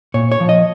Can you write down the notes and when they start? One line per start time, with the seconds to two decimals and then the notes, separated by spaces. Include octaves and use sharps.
0.14 A#2 C#5
0.32 C#5
0.40 F3
0.49 D#5